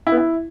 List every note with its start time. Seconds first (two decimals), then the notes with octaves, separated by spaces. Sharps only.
0.07 E4
0.12 B3
0.17 E4